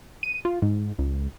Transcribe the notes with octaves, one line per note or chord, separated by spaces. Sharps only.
D#7
F4
G#2
C#2